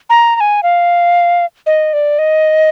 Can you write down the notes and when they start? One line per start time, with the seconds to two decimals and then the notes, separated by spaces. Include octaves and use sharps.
0.10 A#5
0.36 A#5
0.40 G#5
0.63 F5
1.66 D#5
1.93 D5
2.19 D#5